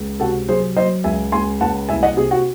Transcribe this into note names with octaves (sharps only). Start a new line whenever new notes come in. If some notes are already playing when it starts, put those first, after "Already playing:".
Already playing: C#2
C3 F#4 A4
F#3 G#4 C5
F#3 C5 D#5
C#2 E5 G#5
C#2 G#5 C6
C#2 F#5 A5
C2 E5 G#5
D#5 F#5
C3 G#4
F#4